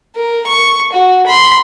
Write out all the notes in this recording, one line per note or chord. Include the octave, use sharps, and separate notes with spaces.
A#4
C#6
F#4
B5 C6